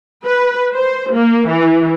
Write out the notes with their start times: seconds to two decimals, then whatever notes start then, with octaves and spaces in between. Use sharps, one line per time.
0.23 B4
0.75 C5
1.13 A#3
1.50 E3